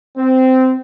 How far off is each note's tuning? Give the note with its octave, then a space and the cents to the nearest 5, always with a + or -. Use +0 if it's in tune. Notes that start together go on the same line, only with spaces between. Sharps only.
C4 -15